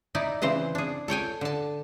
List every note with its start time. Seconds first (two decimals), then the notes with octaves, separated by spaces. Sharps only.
0.15 D#4 E4 D5
0.42 C#3 E3 C4 C5
0.75 D4 G#4
1.08 A4 C#5 G5 G#5
1.41 D3 A5